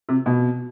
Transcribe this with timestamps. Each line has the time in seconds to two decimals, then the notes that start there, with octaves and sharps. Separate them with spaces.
0.09 C3
0.26 B2